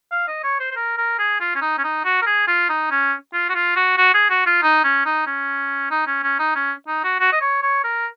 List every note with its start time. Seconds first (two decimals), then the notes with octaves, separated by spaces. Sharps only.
0.12 F5
0.28 D#5
0.44 C#5
0.60 C5
0.71 C5
0.76 A#4
0.98 A#4
1.19 G#4
1.41 F4
1.55 C#4
1.62 D#4
1.78 C#4
1.84 D#4
2.05 F#4
2.22 A#4
2.26 G#4
2.48 F4
2.69 D#4
2.91 C#4
3.33 F4
3.50 F#4
3.55 F4
3.76 F#4
3.98 F#4
4.14 G#4
4.30 F#4
4.46 F4
4.62 D#4
4.84 C#4
5.06 D#4
5.27 C#4
5.91 D#4
6.07 C#4
6.23 C#4
6.39 D#4
6.55 C#4
6.87 D#4
7.04 F#4
7.20 F#4
7.32 D#5
7.41 C#5
7.63 C#5
7.84 A#4